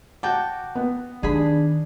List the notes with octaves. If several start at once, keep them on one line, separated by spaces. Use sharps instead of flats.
F#4 G5 A5 D6
B3
D#3 D4 G#4 B5